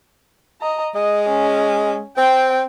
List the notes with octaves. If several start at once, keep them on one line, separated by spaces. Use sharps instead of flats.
D#5 A#5
G#3 D#5
C#4
C4 G5